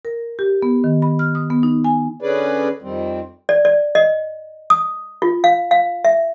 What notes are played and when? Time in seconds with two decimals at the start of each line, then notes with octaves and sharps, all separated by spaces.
0.05 A#4
0.39 G4
0.63 B3
0.84 D#3
1.02 B5
1.19 F6
1.35 D#6
1.50 B3
1.63 D#4
1.84 G#5
2.21 D3 C#4 G#4 B4 D5
2.82 F2 D#3 G3 C4
3.49 D5
3.65 D5
3.95 D#5
4.70 D#6
5.22 F4
5.44 F5
5.71 F5
6.05 E5